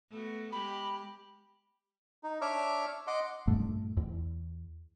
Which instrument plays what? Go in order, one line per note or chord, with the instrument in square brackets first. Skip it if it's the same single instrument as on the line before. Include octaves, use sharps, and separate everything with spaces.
[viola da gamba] A3 B3 F#4
[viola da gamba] G#3 G4 [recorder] B5
[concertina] D#4
D4 C#5 E5 D6 F6
D#5 F#5 C6 D6
[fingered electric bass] G2 A#2 A3
E2